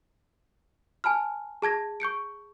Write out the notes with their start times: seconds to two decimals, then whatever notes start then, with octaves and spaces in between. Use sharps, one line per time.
1.04 G#5 A5 B5 F6
1.62 G#4 A5 G#6 A#6
2.00 C#6 G6 C#7 D7